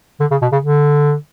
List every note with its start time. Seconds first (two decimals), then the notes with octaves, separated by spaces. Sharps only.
0.20 D3
0.31 C#3
0.42 B2
0.52 C#3
0.63 D3